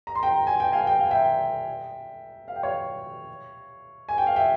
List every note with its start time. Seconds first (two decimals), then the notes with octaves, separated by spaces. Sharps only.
0.07 A#5
0.15 C6
0.23 G5 A#5
0.47 G#5
0.60 G5
0.72 F5 G#5
0.87 G5
0.99 F5
1.11 E5 G5
2.48 F5
2.56 G5
2.63 C#5 F5
4.09 G#5
4.18 G5
4.27 F5
4.36 E5 G5